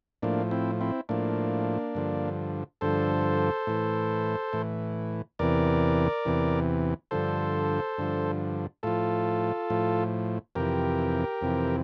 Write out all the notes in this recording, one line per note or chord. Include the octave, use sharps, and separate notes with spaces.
A2 F3 A#3 D4
C4 E4
C4 E4
A2 F3 A#3 D4
G2 D3 F3
G2 D3 F3 A4 C5
A2 E3
A2 E3
E2 C3 E3 A#4 D5
E2 C3 E3
G2 D3 F3 A4 C5
G2 D3 F3
A2 F3 F4 A4
A2 F3
F2 C3 E3 G4 A#4
F2 C3 E3